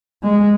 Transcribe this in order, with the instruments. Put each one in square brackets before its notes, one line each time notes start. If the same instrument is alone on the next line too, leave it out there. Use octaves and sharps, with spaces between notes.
[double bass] G#3